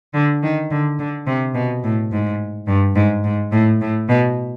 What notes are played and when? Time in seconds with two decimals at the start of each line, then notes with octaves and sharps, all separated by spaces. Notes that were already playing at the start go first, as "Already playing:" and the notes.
0.14 D3
0.43 D#3
0.71 D3
0.99 D3
1.27 C3
1.55 B2
1.84 A2
2.12 G#2
2.67 G2
2.96 G#2
3.24 G#2
3.52 A2
3.81 A2
4.09 B2